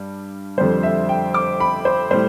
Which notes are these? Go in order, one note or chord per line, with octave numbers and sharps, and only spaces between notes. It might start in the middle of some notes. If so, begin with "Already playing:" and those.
Already playing: G2 G3
F2 D3 G3 C5
E5
G5
D6
B5
C5
A2 G3 C5